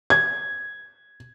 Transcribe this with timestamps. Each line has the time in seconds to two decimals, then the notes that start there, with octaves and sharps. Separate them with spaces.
0.10 G#6